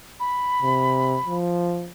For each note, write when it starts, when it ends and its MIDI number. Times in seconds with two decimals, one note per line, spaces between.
0.20 1.36 83
0.62 1.18 48
1.26 1.90 53